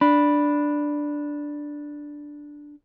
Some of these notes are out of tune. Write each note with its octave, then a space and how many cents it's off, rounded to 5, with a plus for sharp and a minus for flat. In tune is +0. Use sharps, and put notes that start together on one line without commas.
D4 +0 B5 -5